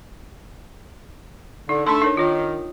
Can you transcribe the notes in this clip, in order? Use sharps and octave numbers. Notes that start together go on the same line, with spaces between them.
D3 D#4
A3 D4 A4 C6
D#4 A#4 C#5
D#3 F4 C#5